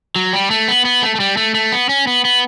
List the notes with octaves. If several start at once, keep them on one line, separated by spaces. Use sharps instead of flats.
F#3
G3
A3
B3
B3
A3
A3
G3
A3
A3
B3
C#4
B3
B3